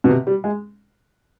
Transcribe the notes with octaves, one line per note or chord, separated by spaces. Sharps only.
B2
C3
G3
G#3